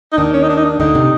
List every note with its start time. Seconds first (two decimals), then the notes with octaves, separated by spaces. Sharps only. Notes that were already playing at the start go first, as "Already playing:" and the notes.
0.12 D#4
0.18 D#2 D#3 D4
0.33 C#4
0.43 D#4
0.49 D4
0.57 D#4
0.64 D4
0.80 D2 D3 D#4
0.95 C3